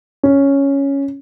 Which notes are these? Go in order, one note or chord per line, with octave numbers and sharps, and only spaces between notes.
C#4